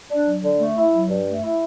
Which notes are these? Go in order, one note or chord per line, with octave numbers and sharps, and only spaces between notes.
D4
F#3
D3
A3
E4
F#3
G2
A3
E4